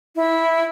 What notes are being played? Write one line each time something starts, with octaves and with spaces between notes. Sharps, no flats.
E4